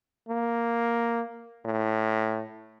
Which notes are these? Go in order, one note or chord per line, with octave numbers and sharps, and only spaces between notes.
A#3
A2